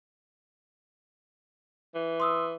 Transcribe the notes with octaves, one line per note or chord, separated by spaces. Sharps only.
E3
C6 D#6 E6